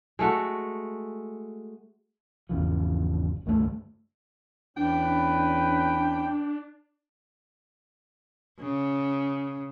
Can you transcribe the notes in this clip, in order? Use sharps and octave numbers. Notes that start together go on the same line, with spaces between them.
G#3 A3 F#4
G#1 E2 C#3 F3
C#2 G2 D#3 A3
E2 C#4 D4 B4 G5
C#3